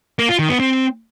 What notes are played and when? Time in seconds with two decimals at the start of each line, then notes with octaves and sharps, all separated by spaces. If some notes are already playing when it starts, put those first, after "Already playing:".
0.19 A#3
0.29 F4
0.39 D#3
0.49 B3
0.60 C4